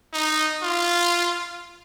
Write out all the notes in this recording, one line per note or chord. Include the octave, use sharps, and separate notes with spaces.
D#4
F4